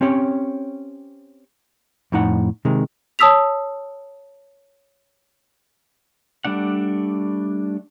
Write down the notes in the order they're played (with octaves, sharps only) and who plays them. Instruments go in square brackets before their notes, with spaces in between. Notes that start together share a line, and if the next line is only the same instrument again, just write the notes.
[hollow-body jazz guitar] C4 C#4 G4 C#5
F2 A2 D#4 F#5
C3 D#3 G#3
[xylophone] C#5 A5 D#6 E6 B6 F7
[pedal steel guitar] G3 A3 D4 F#5